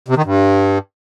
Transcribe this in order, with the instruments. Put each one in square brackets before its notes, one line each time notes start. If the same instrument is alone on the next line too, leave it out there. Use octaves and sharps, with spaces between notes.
[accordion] C3
D#3
G2